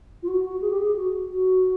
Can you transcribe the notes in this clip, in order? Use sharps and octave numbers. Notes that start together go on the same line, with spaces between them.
F4
F#4
F#4
G#4
G4
G#4
F#4
F#4